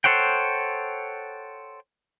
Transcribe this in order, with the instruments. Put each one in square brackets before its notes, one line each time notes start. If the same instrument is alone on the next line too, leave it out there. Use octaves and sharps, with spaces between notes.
[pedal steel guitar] A4 C5 C#5 F#5 G5